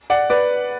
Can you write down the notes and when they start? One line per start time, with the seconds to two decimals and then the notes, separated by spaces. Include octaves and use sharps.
0.10 D5 F#5
0.30 B4 D5